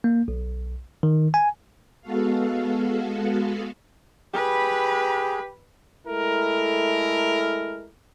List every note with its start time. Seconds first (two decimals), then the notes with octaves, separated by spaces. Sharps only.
0.04 A#3
0.28 B1
1.03 D#3
1.34 G#5
2.02 G#3 B3 F#4 A4 F5
4.34 G4 G#4 B4 B5
6.07 G#3 A3 E4 A4 A#4